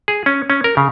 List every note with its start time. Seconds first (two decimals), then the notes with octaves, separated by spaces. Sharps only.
0.08 G#4
0.26 C#4
0.50 C#4
0.64 A#4
0.77 C#3